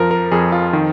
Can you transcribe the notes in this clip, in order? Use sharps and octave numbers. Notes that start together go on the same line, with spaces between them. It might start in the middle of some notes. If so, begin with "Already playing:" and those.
Already playing: F2 F3 A#4
A#4
F2 G#4
F4
D#3